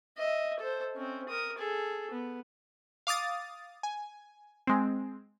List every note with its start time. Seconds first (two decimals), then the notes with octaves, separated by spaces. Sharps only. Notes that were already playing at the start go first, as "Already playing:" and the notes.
0.17 D#5 E5
0.59 A4 C5
0.94 C4 C#4
1.28 A#4 D#6
1.58 G#4 A4
2.10 B3
3.07 F5 D6 D#6 A6
3.83 G#5
4.67 G#3 C4